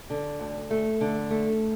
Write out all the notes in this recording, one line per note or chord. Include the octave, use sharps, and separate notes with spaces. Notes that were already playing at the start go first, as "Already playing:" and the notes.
D3
D2
A3
D3
A3